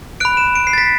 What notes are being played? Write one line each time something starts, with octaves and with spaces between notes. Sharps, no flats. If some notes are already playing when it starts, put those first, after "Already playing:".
B5 F#6 D7
E7
D7
C7
A6
B6